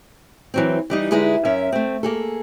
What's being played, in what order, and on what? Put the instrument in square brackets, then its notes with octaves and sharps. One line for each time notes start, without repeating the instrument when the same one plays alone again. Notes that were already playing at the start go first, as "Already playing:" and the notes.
[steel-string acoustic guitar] E3 F#3 C4
E3 G3 D#4
D3 G#3 D#4 E4 G#4 B4
F#2 C#4 A#4 E5 F5
A3 C4
A#3 G#4 A4